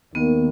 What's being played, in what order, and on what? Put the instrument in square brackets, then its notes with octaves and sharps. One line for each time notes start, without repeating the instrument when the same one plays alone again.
[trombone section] D#2 D#3 A#3 [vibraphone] B3